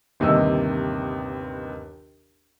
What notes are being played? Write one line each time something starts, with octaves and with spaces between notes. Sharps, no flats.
G1 D#2 C3 D#5 E6